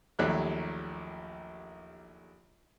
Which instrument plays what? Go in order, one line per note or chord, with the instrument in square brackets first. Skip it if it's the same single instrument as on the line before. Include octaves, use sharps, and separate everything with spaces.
[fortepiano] A#1 D#2 F#3 A3 G4 F#6